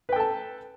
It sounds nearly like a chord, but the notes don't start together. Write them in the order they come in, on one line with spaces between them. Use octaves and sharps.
B4 G5 A4 A5